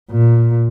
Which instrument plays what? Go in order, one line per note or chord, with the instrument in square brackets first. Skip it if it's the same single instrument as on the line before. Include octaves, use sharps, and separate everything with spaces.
[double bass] A#2